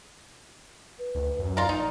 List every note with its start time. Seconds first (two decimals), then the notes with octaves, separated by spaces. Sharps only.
0.99 B4
1.15 D2
1.39 F#2
1.57 F4 A#4 D5
1.69 A#1 D#4